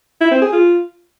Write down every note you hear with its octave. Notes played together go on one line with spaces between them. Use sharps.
E4
C4
G#4
F4